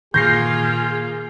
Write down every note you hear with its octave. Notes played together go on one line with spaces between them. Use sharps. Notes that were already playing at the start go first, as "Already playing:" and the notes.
A#2 D#3 A#3 F4 G#4 G6 A#6 C7